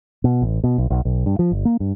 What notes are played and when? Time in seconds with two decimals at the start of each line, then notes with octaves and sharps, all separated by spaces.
0.24 B2
0.42 A1
0.64 B2
0.78 B1
0.90 B1
1.05 B1
1.26 G2
1.39 F3
1.51 G1
1.65 A#3
1.80 G2